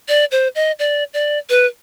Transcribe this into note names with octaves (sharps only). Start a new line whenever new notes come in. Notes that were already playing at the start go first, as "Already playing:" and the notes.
D5
C5
D#5
D5
D5
B4